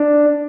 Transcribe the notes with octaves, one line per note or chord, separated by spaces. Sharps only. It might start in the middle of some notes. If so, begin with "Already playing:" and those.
Already playing: D4